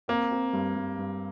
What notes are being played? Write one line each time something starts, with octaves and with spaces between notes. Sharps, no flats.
A#3 C4
C4
G2
G2
G2